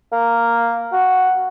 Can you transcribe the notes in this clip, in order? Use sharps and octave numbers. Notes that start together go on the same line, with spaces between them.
A#3
F#4